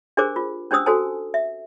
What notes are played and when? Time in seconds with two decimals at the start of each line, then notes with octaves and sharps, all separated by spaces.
0.17 D4 G4 G#4 A#4 C5 D6
0.36 F4
0.71 C#4 D4 G4 C5 D#6 E6
0.86 F#4 A4 C5 G#5 A5
1.34 E5